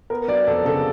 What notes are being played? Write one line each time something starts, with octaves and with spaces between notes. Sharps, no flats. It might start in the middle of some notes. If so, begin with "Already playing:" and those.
B3 A#4
F#3 D5
F2 A4
C#3 A4